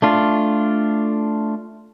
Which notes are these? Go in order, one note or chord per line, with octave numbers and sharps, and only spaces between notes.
A3 D4 F4